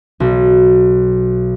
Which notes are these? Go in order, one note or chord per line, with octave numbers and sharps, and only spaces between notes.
B1